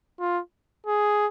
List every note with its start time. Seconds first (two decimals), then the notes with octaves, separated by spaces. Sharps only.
0.20 F4
0.86 G#4